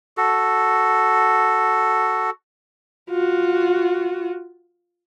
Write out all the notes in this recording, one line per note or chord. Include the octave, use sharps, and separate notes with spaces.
F#4 A4
F4 F#4